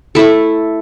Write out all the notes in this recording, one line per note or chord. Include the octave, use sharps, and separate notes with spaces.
A3 E4 A4